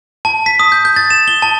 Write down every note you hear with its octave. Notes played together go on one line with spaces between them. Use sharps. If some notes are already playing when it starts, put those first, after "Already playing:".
A5
B6
D#6
G6
G6
A6
E7
G7
A5